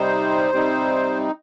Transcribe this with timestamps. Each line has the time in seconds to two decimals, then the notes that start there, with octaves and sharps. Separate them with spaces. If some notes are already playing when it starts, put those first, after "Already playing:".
Already playing: C3 G3 C4 D#4 C5
0.52 C3 G3 C4 D#4